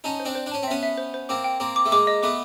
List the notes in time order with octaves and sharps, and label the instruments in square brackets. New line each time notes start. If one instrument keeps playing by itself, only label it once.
[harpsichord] C#4 D#4 [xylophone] A5
[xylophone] C5
[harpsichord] C4 D4
[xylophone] C5
[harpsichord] D4
[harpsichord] C#4 [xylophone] A5
[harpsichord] C4
[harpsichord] B3 C#4 [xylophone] E5
[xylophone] E5
C5
C5
[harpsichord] A#3 C4 [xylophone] D6
[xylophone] G5
[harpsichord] A#3 C4 [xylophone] D6
[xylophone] D6
[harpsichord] A3
[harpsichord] G#3 A#3 [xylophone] D6
[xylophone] D#5
[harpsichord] A3 B3 [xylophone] D6